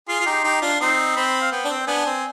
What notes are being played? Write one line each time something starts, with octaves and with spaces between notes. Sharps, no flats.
F4 G#4 C6
F4
D#4 G4
C6
D#4 G4
D4 F4
C4 D#4 C6
C4 B5
F5
B3 G5
D4
C4
B3 D4 G#5
C4